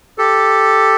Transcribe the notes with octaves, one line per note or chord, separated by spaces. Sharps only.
G4 A4